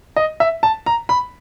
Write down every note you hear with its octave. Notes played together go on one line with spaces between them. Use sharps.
D#5
E5
A5
A#5
B5